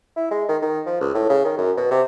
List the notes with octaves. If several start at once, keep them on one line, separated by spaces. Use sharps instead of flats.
E4
G#3
D#3
D#3
F3
C#2
A2
C#3
D#3
F#2
B2
C3